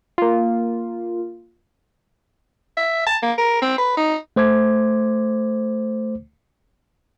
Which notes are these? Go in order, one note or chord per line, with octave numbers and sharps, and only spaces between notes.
A#3 F4
E5
A5
A#3
A#4
C4
B4
D#4
A3 C5 D6 G#6